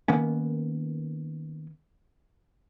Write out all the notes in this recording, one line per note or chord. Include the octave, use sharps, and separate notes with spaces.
D#3 A#3 B3 C#4